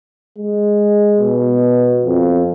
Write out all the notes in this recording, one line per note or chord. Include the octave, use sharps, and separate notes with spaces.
G#3
B2
F2